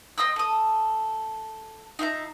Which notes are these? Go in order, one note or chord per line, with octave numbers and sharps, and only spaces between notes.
C4 D#5 D#6 E6
A4 D#6
D#4 F4 E5 A#5